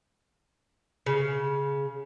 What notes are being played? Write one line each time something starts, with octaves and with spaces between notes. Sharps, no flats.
C#3